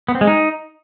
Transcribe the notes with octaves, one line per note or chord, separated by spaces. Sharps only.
B3
C4
G#3
D#4